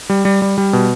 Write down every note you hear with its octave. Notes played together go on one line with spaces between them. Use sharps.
G3
G3
G3
G3
B2